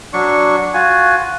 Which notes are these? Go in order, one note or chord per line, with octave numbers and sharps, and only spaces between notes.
F#3 D4 C#6
F4 F#4 G#5